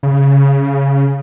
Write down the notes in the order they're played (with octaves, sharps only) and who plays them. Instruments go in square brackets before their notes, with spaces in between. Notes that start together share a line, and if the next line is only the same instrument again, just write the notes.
[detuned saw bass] C#3